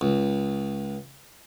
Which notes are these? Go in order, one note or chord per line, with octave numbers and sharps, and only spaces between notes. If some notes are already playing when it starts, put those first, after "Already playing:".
C#2